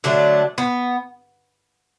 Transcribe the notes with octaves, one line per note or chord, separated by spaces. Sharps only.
D3 F#3 A3 D4
B3